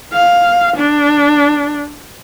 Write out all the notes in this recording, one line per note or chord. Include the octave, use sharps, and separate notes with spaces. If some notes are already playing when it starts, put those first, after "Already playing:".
F5
D4